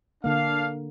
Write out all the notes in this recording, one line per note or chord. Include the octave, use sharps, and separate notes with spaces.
D3 A#3 D4 F5